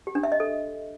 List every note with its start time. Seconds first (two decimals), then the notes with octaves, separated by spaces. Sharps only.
0.07 G4
0.15 D4
0.23 E5
0.32 D#5
0.40 A4